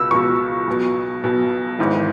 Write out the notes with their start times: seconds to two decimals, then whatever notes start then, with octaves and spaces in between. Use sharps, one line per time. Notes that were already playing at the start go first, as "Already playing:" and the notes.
Already playing: C#2 B2 E6
0.11 C#2 B2 C#6
0.67 B1 B2
1.24 B1 B2
1.79 G#1 G#2 E3